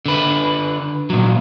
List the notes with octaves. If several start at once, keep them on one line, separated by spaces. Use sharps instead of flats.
D3 B4
A#2 F#3